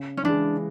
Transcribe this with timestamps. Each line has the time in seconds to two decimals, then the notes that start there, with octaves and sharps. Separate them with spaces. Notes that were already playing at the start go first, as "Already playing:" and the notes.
Already playing: C#3
0.17 C#4
0.24 E3 G#3 D4